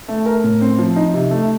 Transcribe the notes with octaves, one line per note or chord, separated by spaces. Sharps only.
A3
A#4
A2
C4
F3
D#4
C3
A3